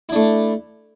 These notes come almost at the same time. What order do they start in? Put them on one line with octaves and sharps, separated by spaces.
E4 D4 A3